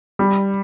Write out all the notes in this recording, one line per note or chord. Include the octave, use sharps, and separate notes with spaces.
G3